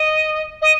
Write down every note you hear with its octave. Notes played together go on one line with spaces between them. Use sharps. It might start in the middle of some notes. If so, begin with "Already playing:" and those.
Already playing: D#5
D#5